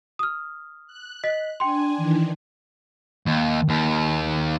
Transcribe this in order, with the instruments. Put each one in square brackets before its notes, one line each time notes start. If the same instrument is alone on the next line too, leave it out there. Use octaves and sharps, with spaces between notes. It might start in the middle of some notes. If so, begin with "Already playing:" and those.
[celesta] D#6 F6
[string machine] F#6
[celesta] D#5 B6
[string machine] D4 G#5 [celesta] G5 C6
[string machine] D#3 E3 D4
[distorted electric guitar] D#2
D#2